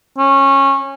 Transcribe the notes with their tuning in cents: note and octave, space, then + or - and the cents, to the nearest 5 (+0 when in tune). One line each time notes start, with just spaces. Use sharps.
C#4 -20